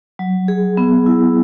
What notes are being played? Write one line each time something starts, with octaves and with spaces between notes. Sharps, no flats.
F#3
G#4
B3
E4